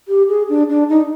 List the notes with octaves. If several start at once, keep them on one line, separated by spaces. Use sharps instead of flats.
G4
G#4
D4
D4
D#4